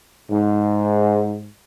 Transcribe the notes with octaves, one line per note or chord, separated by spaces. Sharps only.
G#2